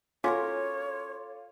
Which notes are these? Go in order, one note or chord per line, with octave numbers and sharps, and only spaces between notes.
C#4 F4 F#4 A4 A#4 C#5 C6 D6